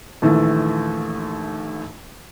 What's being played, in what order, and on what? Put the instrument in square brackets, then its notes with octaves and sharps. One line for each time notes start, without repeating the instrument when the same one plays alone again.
[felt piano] A#1 D#2 E3 A3